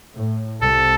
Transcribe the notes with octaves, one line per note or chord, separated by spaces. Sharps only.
A2
C2 A4